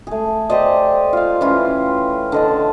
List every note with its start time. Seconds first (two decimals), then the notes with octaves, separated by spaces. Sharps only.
0.07 A3 G#4
0.50 G4 C5 D5 D#5
1.13 F4 F5
1.41 E3 C#4 F4
2.32 D3 D#5 A5